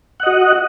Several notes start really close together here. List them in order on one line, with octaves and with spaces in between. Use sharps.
F#5 D#5 F#4